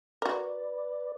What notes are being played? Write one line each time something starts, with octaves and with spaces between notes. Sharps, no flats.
F#4 A#4 B4 D5